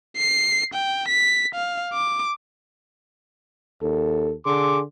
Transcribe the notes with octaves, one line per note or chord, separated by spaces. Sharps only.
C7
G5
B6
F5
D6
D#2 A4
D3 G#4 C6 D6